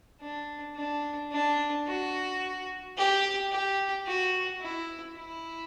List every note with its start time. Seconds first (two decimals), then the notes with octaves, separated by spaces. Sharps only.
0.21 D4
0.76 D4
1.32 D4
1.87 F#4
2.97 G4
3.52 G4
4.06 F#4
4.61 E4
5.17 E4